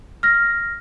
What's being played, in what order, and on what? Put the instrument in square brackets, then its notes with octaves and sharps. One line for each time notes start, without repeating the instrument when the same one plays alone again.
[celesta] F6 A#6